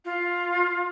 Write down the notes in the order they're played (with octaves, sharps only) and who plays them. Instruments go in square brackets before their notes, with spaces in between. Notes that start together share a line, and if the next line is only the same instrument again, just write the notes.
[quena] F4